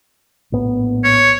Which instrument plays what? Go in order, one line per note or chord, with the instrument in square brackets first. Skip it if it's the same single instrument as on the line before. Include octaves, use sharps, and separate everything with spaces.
[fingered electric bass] A#1 A2 B3
[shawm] C#5